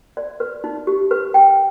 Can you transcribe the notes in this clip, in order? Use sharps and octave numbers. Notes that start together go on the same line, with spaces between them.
D5
B4
D#4
G4
B4
G5